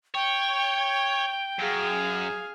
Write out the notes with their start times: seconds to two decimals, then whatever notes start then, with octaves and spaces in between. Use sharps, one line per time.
0.15 C#5 G5
1.59 F#2 G#4 F5